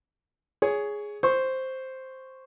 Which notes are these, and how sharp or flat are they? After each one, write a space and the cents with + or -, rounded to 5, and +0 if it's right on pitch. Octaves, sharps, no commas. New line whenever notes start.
G#4 +0 C#5 +15
C5 +0 C#6 +0